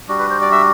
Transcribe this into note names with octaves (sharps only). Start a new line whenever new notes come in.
G3 D4 F#4
B4
C5
D5
E5